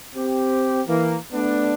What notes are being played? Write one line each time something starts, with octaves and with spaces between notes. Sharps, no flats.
C4 G4
E3 A#3
A3 B3 D4